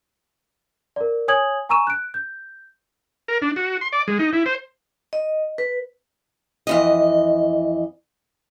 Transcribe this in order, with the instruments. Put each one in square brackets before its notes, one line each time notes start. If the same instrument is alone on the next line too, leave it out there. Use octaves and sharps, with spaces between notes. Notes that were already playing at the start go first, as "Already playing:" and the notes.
[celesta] A#4 D5
C#5 G#5 D#6 G#6 F#7
G#5 A#5 C#6 E6 D#7 E7
F#6 D7
G6
[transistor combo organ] A#4
D4
F#4
C6
D5
G#3
D#4
E4
C5
[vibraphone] D#5
B4
[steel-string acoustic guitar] F2 E3 D#5